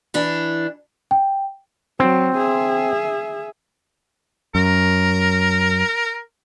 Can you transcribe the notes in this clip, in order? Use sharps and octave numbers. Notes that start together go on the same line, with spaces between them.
E3 D4
G5
F#3 C4
G#4 E5
F#2 A#4